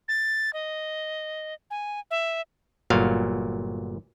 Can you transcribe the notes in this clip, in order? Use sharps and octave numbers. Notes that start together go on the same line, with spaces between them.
A6
D#5
G#5
E5
G1 A#2 F#3 F5